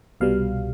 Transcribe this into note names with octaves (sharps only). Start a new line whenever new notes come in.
C2 B2 G3 F5